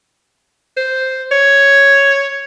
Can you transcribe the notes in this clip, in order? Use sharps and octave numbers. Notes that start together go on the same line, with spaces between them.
C5
C#5